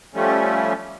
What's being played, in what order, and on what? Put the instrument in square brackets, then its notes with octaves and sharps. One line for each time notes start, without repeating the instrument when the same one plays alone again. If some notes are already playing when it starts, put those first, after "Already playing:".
[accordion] F3 G3 A3 C#4